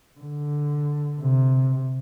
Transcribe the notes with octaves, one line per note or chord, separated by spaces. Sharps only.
D3
C3